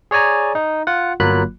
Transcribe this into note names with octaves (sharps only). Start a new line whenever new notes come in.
G#4 C#5 D5 G#5 A#5
D#4
F4 F#5
G1 F#3 A#3 F4 B5 F#6